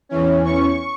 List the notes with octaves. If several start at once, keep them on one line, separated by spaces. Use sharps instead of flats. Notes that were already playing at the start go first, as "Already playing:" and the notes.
E2 E3 C#4
C#6